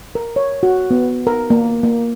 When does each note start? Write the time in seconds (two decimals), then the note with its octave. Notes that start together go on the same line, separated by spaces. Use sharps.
0.15 A#4
0.36 C#5
0.63 F#4
0.91 B3
1.27 A#4
1.50 A#3
1.83 A#3